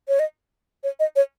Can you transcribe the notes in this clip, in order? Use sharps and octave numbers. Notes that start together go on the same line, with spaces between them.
C#5
D#5
C#5
D#5
C#5